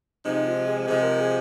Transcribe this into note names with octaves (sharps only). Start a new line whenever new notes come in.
C3 F3 G#3 D#4
F4
G#4
C3 F3 G#3 G#4
A#4
G#4